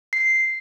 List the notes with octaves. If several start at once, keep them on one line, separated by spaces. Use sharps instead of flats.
C7